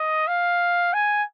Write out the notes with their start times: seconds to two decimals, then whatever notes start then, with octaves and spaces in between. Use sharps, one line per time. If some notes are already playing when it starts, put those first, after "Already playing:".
Already playing: D#5
0.28 F5
0.94 G#5